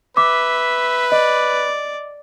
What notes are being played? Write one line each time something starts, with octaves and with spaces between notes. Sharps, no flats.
B4 E5 D6
D5 D#5